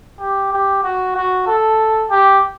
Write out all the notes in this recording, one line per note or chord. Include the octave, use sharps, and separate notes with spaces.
G4
G4
F#4
F#4
A4
G4